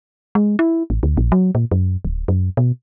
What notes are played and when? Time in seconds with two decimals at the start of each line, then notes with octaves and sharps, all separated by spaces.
0.35 G#3
0.59 E4
0.90 A1
1.03 D2
1.17 A#1
1.32 F#3
1.55 A#2
1.71 F#2
2.05 D1
2.28 F#2
2.57 B2